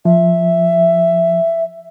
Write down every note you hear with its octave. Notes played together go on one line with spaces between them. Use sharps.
F3 E5